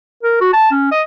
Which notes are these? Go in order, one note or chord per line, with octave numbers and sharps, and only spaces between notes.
A#4
F#4
A5
C#4
D#5